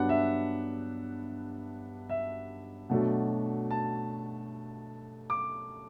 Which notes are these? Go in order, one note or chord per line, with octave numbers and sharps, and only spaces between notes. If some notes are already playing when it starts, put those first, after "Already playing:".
Already playing: G2 F#3 B3 D4 F#5
E5
E5
B2 F#3 A3 D4
A5
D6